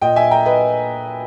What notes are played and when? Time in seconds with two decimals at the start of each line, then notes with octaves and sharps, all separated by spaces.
0.02 A#2 D#5 G5
0.16 E5 G#5
0.31 G5 A#5
0.46 B4 D#5